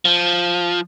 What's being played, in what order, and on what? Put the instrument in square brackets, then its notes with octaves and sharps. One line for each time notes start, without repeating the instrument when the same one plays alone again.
[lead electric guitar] F3